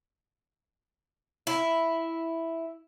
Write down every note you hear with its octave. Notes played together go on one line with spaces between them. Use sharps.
E4